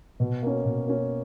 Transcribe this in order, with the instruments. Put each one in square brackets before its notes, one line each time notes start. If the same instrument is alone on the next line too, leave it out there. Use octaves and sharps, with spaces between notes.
[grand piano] B2
A#3 C#4
B2
A#3 C#4